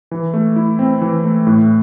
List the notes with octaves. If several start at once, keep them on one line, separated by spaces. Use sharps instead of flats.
E3
A3
E4
C4
E3
A3
A2